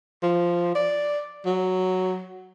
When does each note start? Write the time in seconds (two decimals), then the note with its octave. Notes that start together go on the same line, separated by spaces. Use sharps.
0.23 F3
0.75 D5
1.46 F#3